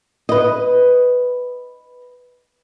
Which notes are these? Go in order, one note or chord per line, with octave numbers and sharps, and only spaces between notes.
B4 D#5